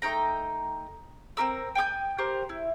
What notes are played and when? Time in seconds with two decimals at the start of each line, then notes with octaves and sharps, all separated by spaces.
0.02 A3 D#4 G5 A#5
1.37 C4 D4 A#4 E6
1.75 G5 G#5 D6 G6
2.18 G4 A#4 C5
2.49 E4